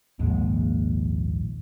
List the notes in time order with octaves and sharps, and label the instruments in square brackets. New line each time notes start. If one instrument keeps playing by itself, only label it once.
[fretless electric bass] A#1 D#2 G#2 G#3